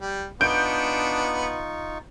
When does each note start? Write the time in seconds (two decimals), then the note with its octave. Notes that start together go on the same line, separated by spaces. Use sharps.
0.01 G3
0.41 B3 D4 D#4 F4 C#6 G6 D7